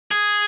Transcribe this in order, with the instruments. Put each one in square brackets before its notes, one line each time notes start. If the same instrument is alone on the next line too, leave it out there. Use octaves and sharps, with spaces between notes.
[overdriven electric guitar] G#4